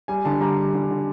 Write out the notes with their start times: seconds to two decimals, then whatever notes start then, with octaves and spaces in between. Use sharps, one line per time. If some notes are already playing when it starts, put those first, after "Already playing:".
0.08 G3 G#5
0.25 D3 A5
0.41 G3 A#5
0.58 G3
0.74 D3
0.91 D3